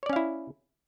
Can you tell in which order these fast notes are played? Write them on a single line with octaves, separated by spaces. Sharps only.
C#5 D5 C#4 F5 E4